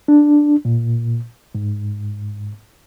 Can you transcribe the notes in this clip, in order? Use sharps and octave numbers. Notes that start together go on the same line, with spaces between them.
D4
A#2
G#2